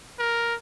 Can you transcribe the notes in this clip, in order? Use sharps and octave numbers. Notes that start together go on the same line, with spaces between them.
A#4